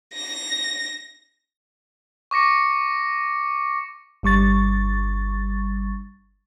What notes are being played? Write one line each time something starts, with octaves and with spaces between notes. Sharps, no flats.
A#6
C#6 D6 A#6 C#7
G1 G3 C#6 A6